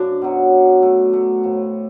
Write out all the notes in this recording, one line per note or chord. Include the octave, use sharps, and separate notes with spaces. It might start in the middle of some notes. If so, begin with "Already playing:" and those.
Already playing: F#2 F3 D4
B2 F#3
A3
A3
A2 F3 A3